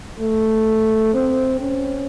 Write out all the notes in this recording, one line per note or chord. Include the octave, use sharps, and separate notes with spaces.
A3
C4
C#4